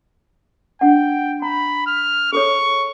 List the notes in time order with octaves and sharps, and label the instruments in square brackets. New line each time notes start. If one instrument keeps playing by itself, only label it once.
[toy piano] D4 F#5 [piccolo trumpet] G5
[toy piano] A#5 [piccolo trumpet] B5
[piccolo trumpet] F6
[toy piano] G#4 A4 C#5 [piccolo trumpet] C#6